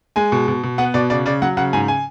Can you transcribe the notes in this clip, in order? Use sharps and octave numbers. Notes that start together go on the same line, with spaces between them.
G#3 G#5
B2
B2
B2
B3 F#5
B2 D5
C#3 D5
C#3 D5
F#3 F#5
C#3 F#5
G#2 G#5
G#5